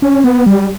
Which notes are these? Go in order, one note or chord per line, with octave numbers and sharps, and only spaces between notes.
C#4
B3
G3